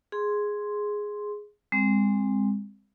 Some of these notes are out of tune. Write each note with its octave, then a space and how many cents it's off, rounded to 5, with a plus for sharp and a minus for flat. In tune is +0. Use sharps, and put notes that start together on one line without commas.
G#4 +0 C6 +0
G#3 -30 C4 +0